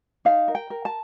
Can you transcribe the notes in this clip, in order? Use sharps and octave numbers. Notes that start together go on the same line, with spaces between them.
D#4 F5
A#4
G5
A#4
A5